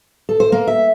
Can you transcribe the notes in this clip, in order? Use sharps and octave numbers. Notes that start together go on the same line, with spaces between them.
A4
C5
A#3
E5